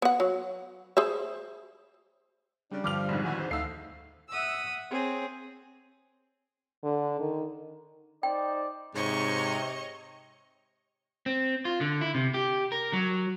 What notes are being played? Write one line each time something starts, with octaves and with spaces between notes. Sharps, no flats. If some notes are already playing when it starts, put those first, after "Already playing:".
B3 F#5
F#3
G#4 C5 E5
C#3 G3 D4
G2 D3 F3 D6 F6 F7
A#1 F2 G#2
D#3 B3 E4 F#4 G#5
C5
D2 A3 D#4 F5 E6 C7
E5 F#5 D#6 E6
C4 G#4 C#5
D3
D#3
D#4 C5 D5 G5
G#2 C3 C#5 D#5 C#6
C4
F4
D3
E4
C3
G4
A#4
F#3